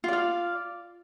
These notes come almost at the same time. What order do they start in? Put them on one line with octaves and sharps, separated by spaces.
F4 D5 F5